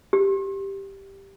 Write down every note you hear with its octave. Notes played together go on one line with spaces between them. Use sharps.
G4